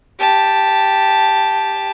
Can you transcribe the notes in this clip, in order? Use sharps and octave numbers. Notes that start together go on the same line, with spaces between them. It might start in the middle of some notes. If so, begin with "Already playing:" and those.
G4 A5